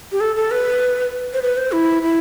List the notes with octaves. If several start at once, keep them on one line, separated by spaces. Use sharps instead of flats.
G4
A4
A4
B4
C5
B4
C5
E4
E4